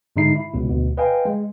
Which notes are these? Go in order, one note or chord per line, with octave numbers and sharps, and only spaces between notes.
G#2 D3 G#3 D#4 E4 C7
E4
C#2 B2
D2 B2
B4 D#5 F5 G5 G#5
G#3